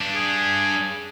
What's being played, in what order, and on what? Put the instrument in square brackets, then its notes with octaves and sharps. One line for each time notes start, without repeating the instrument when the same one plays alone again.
[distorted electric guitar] G2 D4
[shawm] G#4